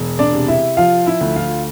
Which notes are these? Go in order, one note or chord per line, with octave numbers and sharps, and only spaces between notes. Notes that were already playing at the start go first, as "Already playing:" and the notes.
Already playing: E1
D4 D5
C3
E4 E5
F3 F4 F5
E4 E5
D2
F4 F5